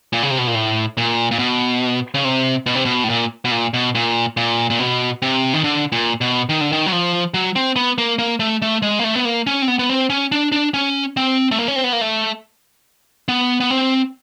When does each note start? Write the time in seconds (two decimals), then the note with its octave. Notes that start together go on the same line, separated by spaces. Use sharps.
0.13 A#2
0.23 C#3
0.31 C3
0.38 B2
0.47 A#2
0.55 A2
0.97 A#2
1.31 A#2
1.39 B2
2.14 C#3
2.25 C3
2.66 B2
2.75 C3
2.85 B2
3.04 A2
3.09 A#2
3.45 B2
3.51 A#2
3.74 B2
3.95 A#2
4.37 A#2
4.70 A#2
4.79 B2
5.22 C3
5.54 D#3
5.64 D3
5.92 A#2
6.21 B2
6.49 D#3
6.61 D3
6.72 D#3
6.86 F#3
6.92 F3
7.34 F#3
7.56 C4
7.76 B3
7.98 A#3
8.19 A#3
8.40 A3
8.62 A3
8.82 G#3
8.99 A#3
9.04 A3
9.15 B3
9.25 A#3
9.47 C#4
9.62 C4
9.68 B3
9.79 B3
9.89 C4
10.10 C#4
10.32 D4
10.52 D4
10.74 C#4
11.17 C4
11.51 A3
11.59 A#3
11.68 C#4
11.76 C4
11.84 B3
11.93 A#3
12.01 A3
13.28 B3
13.60 B3
13.71 C4